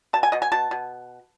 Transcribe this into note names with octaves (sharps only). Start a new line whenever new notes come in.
B2 A5
G#5
B2 D#5
G#5
B2 A5
B2